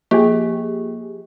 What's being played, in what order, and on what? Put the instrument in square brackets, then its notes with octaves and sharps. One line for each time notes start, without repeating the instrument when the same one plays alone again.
[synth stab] F3 G4 G#4 [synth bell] A#3